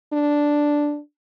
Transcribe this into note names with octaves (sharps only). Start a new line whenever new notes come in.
D4